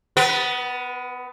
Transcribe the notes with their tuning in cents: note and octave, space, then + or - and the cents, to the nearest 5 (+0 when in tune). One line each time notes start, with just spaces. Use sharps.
B3 +20 B4 -25